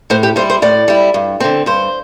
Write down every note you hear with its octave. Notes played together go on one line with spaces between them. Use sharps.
A2 C5
G4
G3 E4 C5
C5
A2 D5
G3 E4
G2
D3 C4
G2 C5